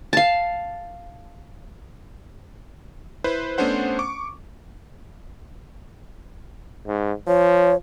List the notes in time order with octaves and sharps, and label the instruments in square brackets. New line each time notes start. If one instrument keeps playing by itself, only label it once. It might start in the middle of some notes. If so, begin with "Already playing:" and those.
[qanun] F5 A5
[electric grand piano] E4 B4 C5
A3 B3 C#4 D4 C5 F#5
C#6 D6
[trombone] G#2
[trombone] F3 [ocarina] C#5